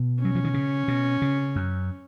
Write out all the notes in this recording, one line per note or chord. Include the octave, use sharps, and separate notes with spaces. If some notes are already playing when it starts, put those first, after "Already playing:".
Already playing: B2
F#3 C#4
F3
D#3
C#3
B2
C#3
F#2